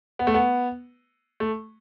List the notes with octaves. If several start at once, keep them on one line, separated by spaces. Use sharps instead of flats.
B3
A3
B3
A3